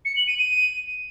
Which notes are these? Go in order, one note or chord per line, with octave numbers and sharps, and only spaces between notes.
C#7
F#7
D#7
D#7